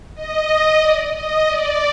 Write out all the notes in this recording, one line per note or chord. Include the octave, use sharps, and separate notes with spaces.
D#5
D5
D#5
D5